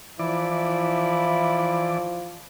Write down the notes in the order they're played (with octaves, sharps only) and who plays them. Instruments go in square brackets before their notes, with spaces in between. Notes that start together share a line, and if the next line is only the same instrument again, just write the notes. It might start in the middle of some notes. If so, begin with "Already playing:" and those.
[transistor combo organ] E3 D5 [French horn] F3 [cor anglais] E4